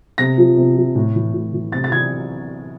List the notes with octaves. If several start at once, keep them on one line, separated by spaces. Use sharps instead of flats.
C3 A#6
F3
C3
F3
A2
E3
A2
E3
C3 A6
A6
E3 G#6